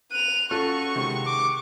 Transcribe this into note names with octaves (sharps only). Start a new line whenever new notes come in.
F#6 D#7 F7
C#4 F4 F#4 A4 C#6
C3 D#3 G#3
D6